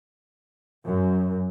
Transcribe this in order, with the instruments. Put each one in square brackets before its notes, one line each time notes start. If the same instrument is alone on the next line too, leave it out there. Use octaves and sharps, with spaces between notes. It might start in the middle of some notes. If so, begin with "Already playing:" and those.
[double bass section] F#2